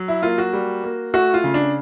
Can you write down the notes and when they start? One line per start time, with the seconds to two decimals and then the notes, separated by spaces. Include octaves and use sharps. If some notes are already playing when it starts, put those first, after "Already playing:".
Already playing: F#3
0.08 E4
0.23 A#3 F4
0.38 F#4
0.53 G3
0.84 A#3
1.14 A3 F#4
1.34 F4
1.44 C#3
1.54 D4